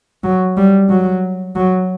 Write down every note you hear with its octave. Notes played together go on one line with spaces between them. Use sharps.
F#3
G3
F#3
F#3